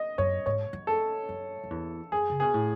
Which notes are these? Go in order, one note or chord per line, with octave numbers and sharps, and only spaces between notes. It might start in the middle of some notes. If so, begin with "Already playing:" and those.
Already playing: D#5
F#2 C#5
G#2 C#5
F#2
A4
F#2
F#2
E2
F#2 G#4
C#3
B2 G#4
A2